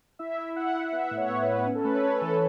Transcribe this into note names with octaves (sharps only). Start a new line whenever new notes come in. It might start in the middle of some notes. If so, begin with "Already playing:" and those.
E4 E5
E4
E4 F#5
E4
B3 E5
A2
C#5
B3
B3 B4
C#4
A4
A3 B4
C#5
C#4 B4
E3 A4